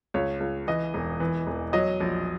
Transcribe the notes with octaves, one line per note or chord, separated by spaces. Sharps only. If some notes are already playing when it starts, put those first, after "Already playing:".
C#2 C#5
C#2
E3 D#5
E1
E3
E1
F#3 D#5
A#1